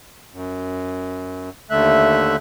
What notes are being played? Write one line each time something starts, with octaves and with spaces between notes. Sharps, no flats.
F#2
D#2 D3 A3 E5 F#6